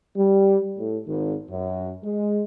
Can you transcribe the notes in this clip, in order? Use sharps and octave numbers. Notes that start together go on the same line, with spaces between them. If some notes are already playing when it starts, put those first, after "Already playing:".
G3
A2
G#1
F#2
G#3